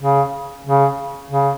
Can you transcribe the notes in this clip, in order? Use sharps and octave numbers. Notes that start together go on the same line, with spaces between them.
C#3
C#3
C#3